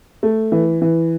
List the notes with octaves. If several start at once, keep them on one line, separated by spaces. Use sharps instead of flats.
A3
E3
E3